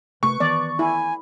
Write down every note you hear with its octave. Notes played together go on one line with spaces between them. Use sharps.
C3 A3 B4 C#6
D#3 E3 B3 D5
E4 G#5